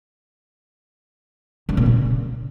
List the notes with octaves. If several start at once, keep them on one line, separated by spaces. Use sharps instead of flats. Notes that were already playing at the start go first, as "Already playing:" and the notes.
D3
A#2
C#3